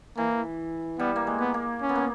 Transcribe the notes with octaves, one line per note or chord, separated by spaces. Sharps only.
E3 A#3
G3 B3
A#3
G#3
B3
A#3
C#4
B3
A#3